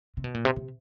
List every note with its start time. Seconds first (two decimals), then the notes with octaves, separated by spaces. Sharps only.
0.17 C3
0.24 B2
0.34 A#2
0.45 C3
0.56 C3